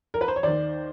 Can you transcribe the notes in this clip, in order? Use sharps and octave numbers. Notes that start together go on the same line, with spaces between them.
A#4
B4
C5
C#5
D#2 D#3 C5 D5